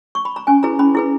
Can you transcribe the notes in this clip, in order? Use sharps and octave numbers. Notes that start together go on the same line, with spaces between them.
C#6
B5
A#5
C#4 G#5
E4 G#4 B4 A#5
C#4 B5
E4 G#4 B4